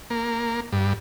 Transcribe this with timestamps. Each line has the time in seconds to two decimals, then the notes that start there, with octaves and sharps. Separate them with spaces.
0.10 A#3
0.72 G2